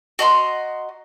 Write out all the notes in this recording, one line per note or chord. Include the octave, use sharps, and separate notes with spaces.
F#4 D#5 A#5 C6